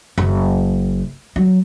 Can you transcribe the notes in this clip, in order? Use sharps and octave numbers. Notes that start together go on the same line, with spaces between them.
F#1
F#3